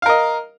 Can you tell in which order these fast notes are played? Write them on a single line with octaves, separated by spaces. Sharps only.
F5 A#4 D#5